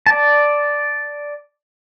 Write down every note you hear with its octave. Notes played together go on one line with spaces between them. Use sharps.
D5 A5